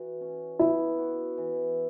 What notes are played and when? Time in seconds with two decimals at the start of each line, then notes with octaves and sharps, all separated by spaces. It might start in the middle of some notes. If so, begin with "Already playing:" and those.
Already playing: E3 F#4
0.21 C#4
0.59 B3 E4
0.98 F#4
1.38 E3